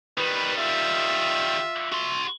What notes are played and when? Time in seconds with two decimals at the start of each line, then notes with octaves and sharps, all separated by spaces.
0.18 D#3 G3 B4
0.58 F4 E5
1.92 F#4 C6